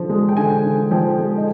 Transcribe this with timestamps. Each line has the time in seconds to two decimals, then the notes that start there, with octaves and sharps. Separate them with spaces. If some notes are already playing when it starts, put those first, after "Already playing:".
Already playing: D3 F3
0.09 G#3
0.29 G5
0.37 D3 G#5
0.65 D3
0.91 F3 G5
1.19 G#3
1.37 D#5